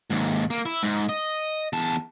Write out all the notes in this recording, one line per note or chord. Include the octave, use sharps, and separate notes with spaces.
D#2 G#2
A#3
E4
G#2
D#5
E2 A5